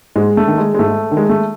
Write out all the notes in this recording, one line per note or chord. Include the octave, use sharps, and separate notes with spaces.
G#2 G#3
A3
D#3
G#3
G#3
G#2 A3
D#3
G#3
A3